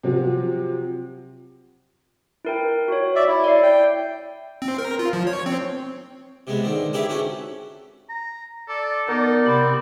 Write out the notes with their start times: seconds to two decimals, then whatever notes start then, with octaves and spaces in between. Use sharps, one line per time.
0.03 C3 F3 F#3
2.45 E4 A#4 G5
2.88 F#4 C#5
3.16 D5 E5
3.28 E4
3.44 D5 E5 C7
3.63 G5
4.62 C4
4.78 A#4
4.99 F4
5.13 F3
5.27 C#5
5.46 C4
6.47 C3 G#3 B3
6.64 D3 D#3 C4
6.93 D#4 E4 G4 G#4 B4 E5
7.09 C4 C#4 F#4 A4
8.09 A#5
8.69 A4 D5
9.09 B3 D#4 A#4 D5
9.46 C3 C4 B5